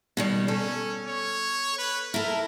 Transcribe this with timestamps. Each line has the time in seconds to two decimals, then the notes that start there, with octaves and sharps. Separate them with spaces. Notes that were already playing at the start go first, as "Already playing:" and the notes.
0.17 B2 D#3 G3
0.48 C#4 A4
1.07 C#5
1.78 B4
2.14 E4 A4 A#4